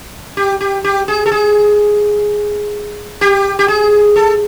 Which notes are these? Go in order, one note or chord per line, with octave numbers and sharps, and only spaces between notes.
G4
G4
G4
G#4
A4
G#4
G4
G4
G#4
A4